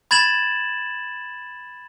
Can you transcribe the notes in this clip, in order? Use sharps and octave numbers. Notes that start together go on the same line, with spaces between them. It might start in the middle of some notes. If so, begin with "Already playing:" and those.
B5 G#6 A6 E7 F#7